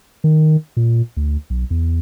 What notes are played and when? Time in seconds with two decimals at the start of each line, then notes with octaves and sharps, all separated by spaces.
0.24 D#3
0.77 A#2
1.17 D2
1.50 B1
1.70 E2